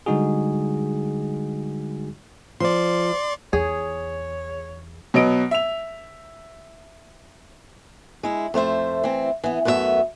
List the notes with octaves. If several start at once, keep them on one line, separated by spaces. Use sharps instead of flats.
D3 G3 G#3 D#4 F#4 G#4
F3 D5 C6
E2 G#4 C#5
B2 F#3 B3 D#5 D7
E5 F7
G#3 E4
F2 A3 C5 E5
E3 C4
E3 B3
F#2 A3 B3 F4 E5